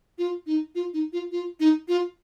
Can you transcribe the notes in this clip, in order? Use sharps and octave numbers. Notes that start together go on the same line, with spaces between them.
F4
D#4
F4
D#4
F4
F4
D#4
F4